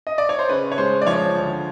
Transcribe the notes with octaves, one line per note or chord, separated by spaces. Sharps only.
D#5
D5
C#5
C5
C#3 B4
C#5
G#3 C5
D5
F3 C#5
D2